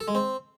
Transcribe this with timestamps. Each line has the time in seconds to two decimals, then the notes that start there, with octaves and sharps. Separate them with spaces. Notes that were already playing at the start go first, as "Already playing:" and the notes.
0.01 A4
0.08 G#3
0.15 C4